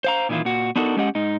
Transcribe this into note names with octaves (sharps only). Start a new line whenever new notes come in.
C5 F5 A#5
A#2 D#3 E3 E4 F4
A#2 F#4
B3 D4 D#4 F#4 A4 A#4
G#3 C#4 G4 D#5 F#5
G#2 D#4